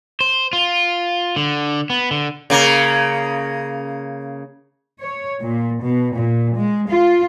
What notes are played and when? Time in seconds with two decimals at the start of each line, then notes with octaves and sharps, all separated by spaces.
0.20 C5
0.53 F4
1.36 D3
1.90 B3
2.11 D3
2.50 C#3 A#3
4.99 C#5
5.41 A#2
5.82 B2
6.14 A#2
6.56 G#3
6.90 F4